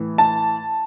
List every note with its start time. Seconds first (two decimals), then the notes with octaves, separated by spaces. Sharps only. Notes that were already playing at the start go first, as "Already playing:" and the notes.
Already playing: A2 E3
0.18 A5